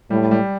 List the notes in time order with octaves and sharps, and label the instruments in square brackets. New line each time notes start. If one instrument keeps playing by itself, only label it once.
[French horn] A2 [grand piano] G3
[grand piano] G3